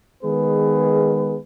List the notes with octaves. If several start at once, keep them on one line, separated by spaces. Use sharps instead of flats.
D#3 G#3 B3 G#4 B4